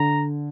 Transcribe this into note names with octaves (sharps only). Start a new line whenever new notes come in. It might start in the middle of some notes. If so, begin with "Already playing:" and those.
Already playing: D3 A#5